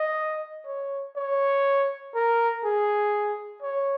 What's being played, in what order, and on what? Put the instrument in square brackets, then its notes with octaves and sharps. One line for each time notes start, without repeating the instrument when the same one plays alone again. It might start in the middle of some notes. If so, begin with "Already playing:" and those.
Already playing: [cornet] D#5
C#5
C#5
A#4
G#4
C#5